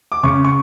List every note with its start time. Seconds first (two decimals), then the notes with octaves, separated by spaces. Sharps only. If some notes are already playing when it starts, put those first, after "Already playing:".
0.12 D6
0.23 C#3 C#6
0.44 C#6